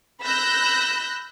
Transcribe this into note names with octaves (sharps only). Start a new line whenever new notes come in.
B5 E6 F#6 G6 A#6